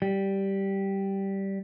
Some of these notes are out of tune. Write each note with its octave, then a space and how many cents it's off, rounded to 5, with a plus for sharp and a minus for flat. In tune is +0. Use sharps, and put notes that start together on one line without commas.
G3 -5